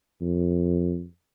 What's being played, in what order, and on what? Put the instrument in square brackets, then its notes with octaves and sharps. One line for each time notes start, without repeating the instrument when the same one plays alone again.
[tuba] F2